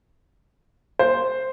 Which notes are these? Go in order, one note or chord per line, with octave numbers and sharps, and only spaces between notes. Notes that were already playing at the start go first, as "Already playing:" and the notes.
C5